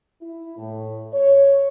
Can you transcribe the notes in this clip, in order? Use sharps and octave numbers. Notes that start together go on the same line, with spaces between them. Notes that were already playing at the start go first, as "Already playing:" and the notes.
E4
A2
C#5